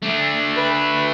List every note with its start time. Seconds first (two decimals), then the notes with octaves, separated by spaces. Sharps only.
0.02 A3 D4
0.57 B4